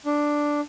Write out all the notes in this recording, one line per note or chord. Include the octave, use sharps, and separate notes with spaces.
D4